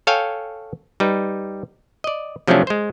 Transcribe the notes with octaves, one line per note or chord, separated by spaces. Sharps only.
A4 C#5 F5 G5 G#5
G3 D#4 B4
D5 D#5
C3 F3 F#3 A3 C#4 D4
G#3 C5